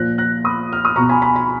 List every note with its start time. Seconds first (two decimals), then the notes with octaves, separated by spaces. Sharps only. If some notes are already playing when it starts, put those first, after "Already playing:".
Already playing: A#2 F3 F#6 A#6
0.18 F#6 A#6
0.44 B5 D#6
0.73 F6
0.85 D#6
0.96 B2 A#5 C#6
1.09 G#5 B5
1.22 G#5 B5
1.36 B5